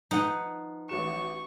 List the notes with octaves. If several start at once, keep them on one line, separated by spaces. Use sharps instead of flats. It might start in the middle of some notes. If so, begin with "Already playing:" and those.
F3 D#4 B4 F#5
A1 F#4 C#6 E7